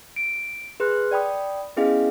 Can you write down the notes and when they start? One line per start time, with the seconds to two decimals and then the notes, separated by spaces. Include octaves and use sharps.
0.16 D7
0.80 G#4 B4 C6 F#6
1.11 D5 G5 B5 D#6
1.77 B3 C#4 E4 G#4 D#5 F5